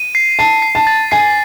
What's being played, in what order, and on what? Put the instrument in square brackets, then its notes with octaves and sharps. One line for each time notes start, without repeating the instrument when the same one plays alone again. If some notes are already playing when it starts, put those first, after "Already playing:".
Already playing: [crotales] D#7
C7
[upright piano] A5 [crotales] C7
[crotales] C7
[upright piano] A5
[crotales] A6
[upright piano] G#5 [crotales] C7